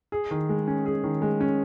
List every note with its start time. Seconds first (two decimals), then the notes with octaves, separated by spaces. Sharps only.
0.12 G#4
0.31 D#3
0.49 G#3
0.68 C#4
0.86 G#4
1.04 D#3
1.22 G#3
1.41 C#4